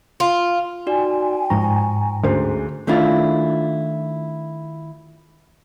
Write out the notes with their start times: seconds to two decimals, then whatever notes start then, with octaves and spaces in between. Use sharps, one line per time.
0.20 F4
0.86 D#4 F#4 D5 G5 G#5
1.50 G#2 F3 A#5 C#6
2.24 D2 C#4 G#4 C5
2.87 D#3 A3 D4 E4 F4